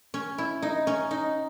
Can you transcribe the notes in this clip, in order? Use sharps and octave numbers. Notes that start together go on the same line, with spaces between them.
C#4
E4
D#4
C#4
D#4